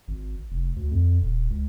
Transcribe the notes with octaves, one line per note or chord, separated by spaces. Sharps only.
G#1
F1
D2
F2
D#1
C#2